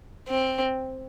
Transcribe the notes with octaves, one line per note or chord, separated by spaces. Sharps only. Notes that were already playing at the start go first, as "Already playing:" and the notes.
C4